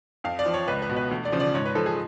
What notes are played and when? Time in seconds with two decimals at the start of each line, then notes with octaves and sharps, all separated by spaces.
0.24 F2 F5
0.39 D5
0.46 F3
0.54 C#5
0.68 C#2 B4
0.82 B4
0.89 B2
0.96 B4
1.11 D2
1.25 D5
1.32 C#3 F3
1.40 D5
1.54 G#2 C#5
1.66 B4
1.75 F3 A4
1.86 G#4